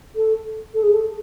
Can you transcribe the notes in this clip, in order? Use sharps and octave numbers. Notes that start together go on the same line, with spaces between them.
A4
A4
G#4
A4